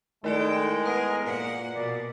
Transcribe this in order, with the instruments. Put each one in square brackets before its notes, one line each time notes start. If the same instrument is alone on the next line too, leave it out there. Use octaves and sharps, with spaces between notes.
[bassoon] D#3 [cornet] G#3 [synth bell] A3 E4 D5 [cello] A4 G5
[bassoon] B3 [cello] G#4 A#4 [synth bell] A#5 D#6
[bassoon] A#2 [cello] A#3 F#5
[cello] B2 [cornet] D5